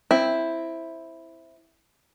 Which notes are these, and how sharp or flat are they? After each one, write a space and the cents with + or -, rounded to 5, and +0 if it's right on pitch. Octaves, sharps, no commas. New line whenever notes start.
C4 +5 E4 +0